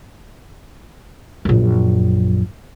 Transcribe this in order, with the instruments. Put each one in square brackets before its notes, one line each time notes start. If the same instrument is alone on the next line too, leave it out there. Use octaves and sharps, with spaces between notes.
[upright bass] A#1 F#2